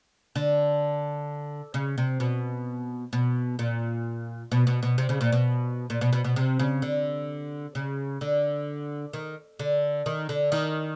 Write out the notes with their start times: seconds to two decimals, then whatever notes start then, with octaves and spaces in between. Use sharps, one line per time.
0.35 D3
1.74 C#3
1.98 C3
2.20 B2
3.13 B2
3.59 A#2
4.52 B2
4.67 B2
4.83 B2
4.98 C3
5.09 C#3
5.21 A#2
5.32 B2
5.90 A#2
6.01 B2
6.13 B2
6.24 B2
6.36 C3
6.59 C#3
6.82 D3
7.75 C#3
8.21 D3
9.13 D#3
9.59 D3
10.06 D#3
10.29 D3
10.52 D#3